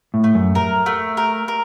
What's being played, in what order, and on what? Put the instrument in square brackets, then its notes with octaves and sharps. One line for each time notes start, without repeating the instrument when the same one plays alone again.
[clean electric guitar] A2
[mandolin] A3
[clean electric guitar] F#2
[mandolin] A#4
A3
A#4
A#4